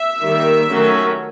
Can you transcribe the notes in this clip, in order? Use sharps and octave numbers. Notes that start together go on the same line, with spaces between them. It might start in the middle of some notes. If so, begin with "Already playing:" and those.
Already playing: E5
D#3 G3 A#3
D#3 F#3 A3 C#4